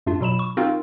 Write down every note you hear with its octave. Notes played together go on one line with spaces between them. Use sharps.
F#2 A3 D4 F4
B2 F#3 B5 E7
C#6
C4 D#4 F4 F#4 A#4 F5